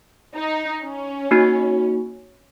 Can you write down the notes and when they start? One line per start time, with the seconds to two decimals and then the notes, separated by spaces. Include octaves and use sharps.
0.36 D#4
0.84 C#4
1.31 A#3 D#4 F#4